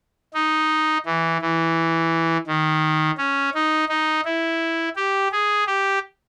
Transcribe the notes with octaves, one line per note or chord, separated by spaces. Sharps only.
D#4
E3
E3
D#3
C#4
D#4
D#4
E4
G4
G#4
G4